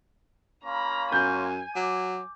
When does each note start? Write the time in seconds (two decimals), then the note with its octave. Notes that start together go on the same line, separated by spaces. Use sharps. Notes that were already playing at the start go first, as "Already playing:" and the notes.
0.64 A#3 C#4 F4 A#5 B5
1.12 F#2 G#5 G6
1.76 F#3 D6